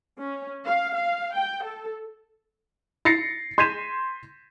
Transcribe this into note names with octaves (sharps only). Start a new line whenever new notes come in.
C#4
F5
F5
G5
A4
A6 A#6 C7 C#7
C6 G6 G#6 B6 D#7 E7